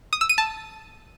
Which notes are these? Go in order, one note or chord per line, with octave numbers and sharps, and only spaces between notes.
D#6
E6
D#7
A5